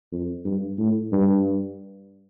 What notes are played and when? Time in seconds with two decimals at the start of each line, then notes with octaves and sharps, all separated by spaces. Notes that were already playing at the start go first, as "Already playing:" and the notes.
0.12 F2
0.45 G2
0.79 A2
1.13 G2